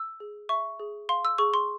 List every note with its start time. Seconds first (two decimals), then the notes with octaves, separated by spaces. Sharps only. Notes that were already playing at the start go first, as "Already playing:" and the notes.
Already playing: E6
0.20 G#4
0.49 E5 C#6
0.80 G#4
1.09 F5 C6
1.25 E6
1.38 G#4 C#6
1.54 C6